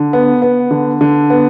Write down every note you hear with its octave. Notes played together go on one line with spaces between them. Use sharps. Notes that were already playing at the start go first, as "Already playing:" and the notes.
Already playing: D3
B3
B3
D3
D3
B3